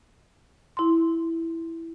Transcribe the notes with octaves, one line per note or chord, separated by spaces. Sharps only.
E4 C6